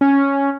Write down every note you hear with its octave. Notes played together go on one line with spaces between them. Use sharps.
C#4